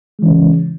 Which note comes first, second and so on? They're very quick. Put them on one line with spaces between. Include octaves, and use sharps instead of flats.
G#3 E3 C#4 C#3